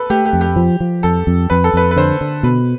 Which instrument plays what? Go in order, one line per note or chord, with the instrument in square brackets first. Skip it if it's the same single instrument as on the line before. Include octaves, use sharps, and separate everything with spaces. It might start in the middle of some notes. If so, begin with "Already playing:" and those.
Already playing: [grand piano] A4 B4
[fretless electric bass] A3 [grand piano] G4
[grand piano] G4
[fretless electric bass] F2
[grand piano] G4
[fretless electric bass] F3
F3
[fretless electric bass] F2 [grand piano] A4
[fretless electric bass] F2
[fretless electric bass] F2 [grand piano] B4
[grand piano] A4
[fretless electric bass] F2 [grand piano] B4
[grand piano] B4
[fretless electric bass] D3 [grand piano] C5
[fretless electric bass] D3
[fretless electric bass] B2 [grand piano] B4